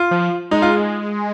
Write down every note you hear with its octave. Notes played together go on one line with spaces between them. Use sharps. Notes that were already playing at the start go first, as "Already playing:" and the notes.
Already playing: F4
F3
G#3 D#4
F4